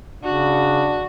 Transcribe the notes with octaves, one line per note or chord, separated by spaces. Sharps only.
C#3 D4 F#4